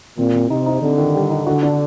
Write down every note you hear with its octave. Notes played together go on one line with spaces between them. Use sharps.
A#2 C4
C4
C3 D#4
D#4
D3 C4
D#3
G3
D#4
D3 F#4
D4